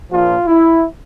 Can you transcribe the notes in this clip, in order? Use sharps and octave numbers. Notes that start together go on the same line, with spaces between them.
A#1 A#2 F3 F4
E4